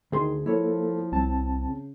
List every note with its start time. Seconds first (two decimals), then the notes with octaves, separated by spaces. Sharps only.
0.12 D2 D#3 G#4 C6
0.46 F3 A#3 E4 A4 C#5
1.12 C2 C4 A5
1.64 C#3